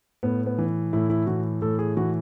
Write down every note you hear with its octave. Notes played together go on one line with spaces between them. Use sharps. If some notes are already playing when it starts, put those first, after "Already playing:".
A2 B3
B3
E3
A2 E4
E4
E3 F#4
A2 A4
G#4
E3 F#4